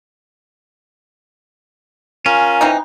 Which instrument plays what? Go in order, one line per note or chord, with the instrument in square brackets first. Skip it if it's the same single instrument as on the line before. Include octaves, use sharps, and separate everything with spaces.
[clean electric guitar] C#4 [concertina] F4 A#4 F5 [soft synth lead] G#5
[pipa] E3 C4 D#4